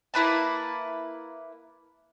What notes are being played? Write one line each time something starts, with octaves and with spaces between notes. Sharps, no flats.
A#3 E4 B4 A5